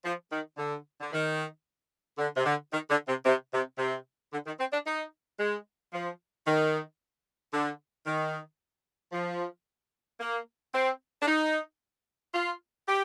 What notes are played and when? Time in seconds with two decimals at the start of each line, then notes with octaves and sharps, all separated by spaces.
0.04 F3
0.31 D#3
0.58 D3
1.01 D3
1.12 D#3
2.18 D3
2.36 C3
2.45 D3
2.72 D#3
2.89 D3
3.07 C3
3.25 C3
3.52 C3
3.78 C3
4.32 D3
4.45 D#3
4.59 C4
4.72 D4
4.85 D#4
5.39 G#3
5.92 F3
6.46 D#3
7.53 D3
8.06 D#3
9.12 F3
10.20 A#3
10.73 C4
11.21 D4
11.26 D#4
12.33 F4
12.87 G4